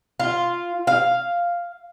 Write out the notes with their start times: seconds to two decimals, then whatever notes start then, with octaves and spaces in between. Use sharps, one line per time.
0.20 F4
0.87 F5